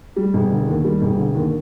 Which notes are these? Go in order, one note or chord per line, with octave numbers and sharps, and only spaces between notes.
G3
E1
D3
D#2
G3
E1
D3
D#2